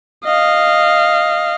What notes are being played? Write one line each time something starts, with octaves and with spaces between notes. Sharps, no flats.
D#5 F5